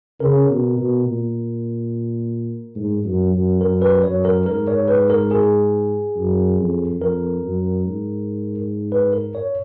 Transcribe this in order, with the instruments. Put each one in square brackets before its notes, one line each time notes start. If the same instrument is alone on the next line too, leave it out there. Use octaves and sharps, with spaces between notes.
[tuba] C#3 [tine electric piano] A#4
[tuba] B2
B2
A#2
G#2
F#2
F#2
[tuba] F#2 [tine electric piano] A#4
[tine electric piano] B4
[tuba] F#2 [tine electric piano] C#5
[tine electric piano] A#4
[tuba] G#2 [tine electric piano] A#4
[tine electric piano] C#5
B4
A#4
G#4
[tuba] F#2
F2
[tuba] F2 [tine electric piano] A#4
[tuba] F#2
G#2
[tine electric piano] B4
A#4
C#5